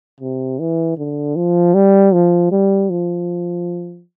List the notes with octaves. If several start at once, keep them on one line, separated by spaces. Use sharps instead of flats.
C3
E3
D3
F3
G3
F3
G3
F3